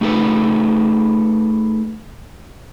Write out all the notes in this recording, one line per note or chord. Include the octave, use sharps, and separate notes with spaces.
A3 D#4 G#4 A4 B4